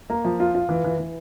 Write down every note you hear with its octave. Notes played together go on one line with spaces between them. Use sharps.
A#3
F3
F4
F4
E3
E3
E3